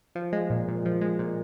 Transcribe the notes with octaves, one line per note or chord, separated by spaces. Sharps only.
F3
G#3
A#2
A#2
F3
G#3
A#2